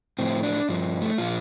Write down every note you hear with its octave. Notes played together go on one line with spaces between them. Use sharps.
A2 F3 C4
D4
G2 F3
A3
A#2 F3 F4